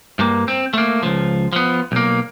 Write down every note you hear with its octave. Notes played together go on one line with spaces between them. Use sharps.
G2 A#3
C4
A3 A#3
C#2 F3
F3 B3
B1 A#3